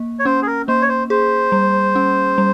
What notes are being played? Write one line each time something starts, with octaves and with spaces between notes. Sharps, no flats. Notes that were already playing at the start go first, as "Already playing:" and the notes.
Already playing: A#3
C#5
C#4 C5
G#4
A#4
A#3 C5
C#5
C5
G#4 C5
G3
C#4
G3